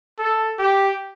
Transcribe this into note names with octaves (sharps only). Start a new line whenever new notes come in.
A4
G4